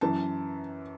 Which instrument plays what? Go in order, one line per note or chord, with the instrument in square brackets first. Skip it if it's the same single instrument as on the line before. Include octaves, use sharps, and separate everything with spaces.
[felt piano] F#2 E3 A5